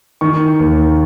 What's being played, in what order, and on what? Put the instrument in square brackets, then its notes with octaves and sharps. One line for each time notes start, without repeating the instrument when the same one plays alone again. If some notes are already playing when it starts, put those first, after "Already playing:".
[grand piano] D#3 C#6
D#2